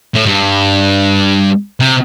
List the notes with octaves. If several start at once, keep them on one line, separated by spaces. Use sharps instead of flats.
A2
G2
C3